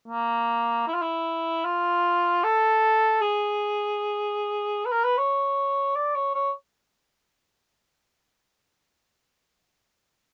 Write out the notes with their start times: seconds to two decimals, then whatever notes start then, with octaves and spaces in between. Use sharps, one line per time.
0.08 A#3
0.87 E4
0.94 F4
1.02 E4
1.65 F4
2.44 A4
3.21 G#4
4.86 B4
4.92 A#4
5.04 B4
5.17 C#5
5.96 D5
6.15 C#5
6.34 C#5